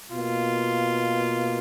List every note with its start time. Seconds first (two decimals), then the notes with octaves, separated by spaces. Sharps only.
0.12 B2 A#3 F4